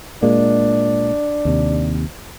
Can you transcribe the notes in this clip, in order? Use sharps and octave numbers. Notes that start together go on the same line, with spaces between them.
A#2 G#3 A#3 D4
D#2 C3